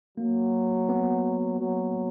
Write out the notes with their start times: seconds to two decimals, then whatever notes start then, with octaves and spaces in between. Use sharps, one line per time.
0.17 F#3 A#3
0.89 B3
1.60 F#3